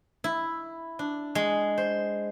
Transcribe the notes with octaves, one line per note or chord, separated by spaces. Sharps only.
E4
D4
G#3
C5